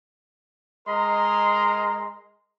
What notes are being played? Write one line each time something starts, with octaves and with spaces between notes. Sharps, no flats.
G#3 A#4 D#5 A#5 C6